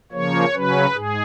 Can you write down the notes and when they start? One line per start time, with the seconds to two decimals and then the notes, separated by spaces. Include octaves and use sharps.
0.12 C#3 F3 A#3 C#5
0.53 C#3 F#3 C#4 B4
0.94 G#2 G#4